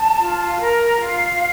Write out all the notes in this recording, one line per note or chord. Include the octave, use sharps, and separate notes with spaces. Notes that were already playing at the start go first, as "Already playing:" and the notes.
Already playing: A5
F4
A#4
F4 F5